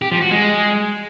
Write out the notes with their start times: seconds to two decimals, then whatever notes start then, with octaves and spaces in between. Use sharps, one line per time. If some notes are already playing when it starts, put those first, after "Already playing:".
0.02 G4
0.11 F3
0.21 F#4
0.31 G#3